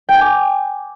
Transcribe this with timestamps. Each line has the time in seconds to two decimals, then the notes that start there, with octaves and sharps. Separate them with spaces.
0.09 G5
0.15 G#5
0.21 D6